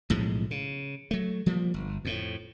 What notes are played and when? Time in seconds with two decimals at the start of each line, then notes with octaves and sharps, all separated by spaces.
0.10 B1 A2 F3 G#3
0.51 C#3
1.11 F#3 A3
1.46 F3 G3 A#3
1.74 G1
2.05 F2 A2